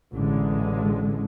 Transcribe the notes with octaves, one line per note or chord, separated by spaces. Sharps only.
A1 D3 G#3